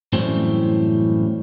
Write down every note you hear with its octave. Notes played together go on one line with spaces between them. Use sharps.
F#2 A2 E3 G3 C4 C#4